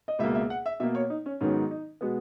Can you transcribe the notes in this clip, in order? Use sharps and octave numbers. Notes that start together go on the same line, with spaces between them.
D#5
C#2 B2 A#3 E5
E5
F#5
E5
B2 A#3 E5
C#5
D#4
C#4
G#2 D#3 F#3 B3 C#4
D#4
B2 G#3 B3 F#4